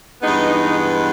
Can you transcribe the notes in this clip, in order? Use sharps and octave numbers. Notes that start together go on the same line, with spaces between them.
G2 E3 G#3 B3 D#4